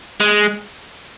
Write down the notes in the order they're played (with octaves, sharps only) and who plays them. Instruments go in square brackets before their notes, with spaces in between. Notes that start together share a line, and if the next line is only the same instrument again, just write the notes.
[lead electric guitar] G#3